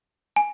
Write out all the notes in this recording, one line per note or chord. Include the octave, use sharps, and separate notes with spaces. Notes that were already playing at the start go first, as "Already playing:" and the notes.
G#5